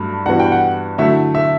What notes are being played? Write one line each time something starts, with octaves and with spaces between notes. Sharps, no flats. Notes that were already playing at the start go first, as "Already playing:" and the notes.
Already playing: G2 F#3 A3
G2 E3 B3 F#4 F#5
G5
F#5
D3 F#3 A3 E4 E5
E5